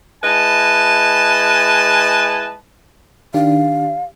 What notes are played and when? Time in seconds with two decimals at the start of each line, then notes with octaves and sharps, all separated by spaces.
0.24 G#3 E4 B4 D#5 G#5 A5
3.34 D#3 D4 G4 F5